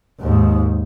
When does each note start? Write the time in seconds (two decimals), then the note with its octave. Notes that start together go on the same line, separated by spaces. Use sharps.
0.20 D#2 G#2